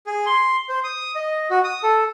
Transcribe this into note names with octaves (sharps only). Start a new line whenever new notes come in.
G#4
C6
C5
D#6
D#5
F#4
D#6
A4